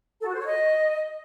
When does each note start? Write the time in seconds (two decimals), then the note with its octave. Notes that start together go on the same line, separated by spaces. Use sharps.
0.20 A4
0.26 F#4
0.33 C5
0.39 C#5
0.46 D#5